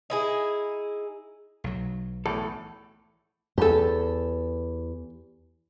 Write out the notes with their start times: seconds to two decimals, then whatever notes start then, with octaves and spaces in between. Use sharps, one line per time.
0.10 D#4 E4 G#4
1.64 B1 F#3
2.26 E2 A2 A4
3.58 E2 G4 A4